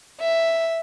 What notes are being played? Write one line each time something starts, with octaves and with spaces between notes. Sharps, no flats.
E5